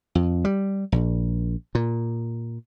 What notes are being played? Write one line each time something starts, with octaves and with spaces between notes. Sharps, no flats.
F2
G3
A#1
A#2